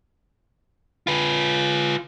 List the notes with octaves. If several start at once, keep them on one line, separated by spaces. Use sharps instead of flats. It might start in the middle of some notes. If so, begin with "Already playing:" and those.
F4 B4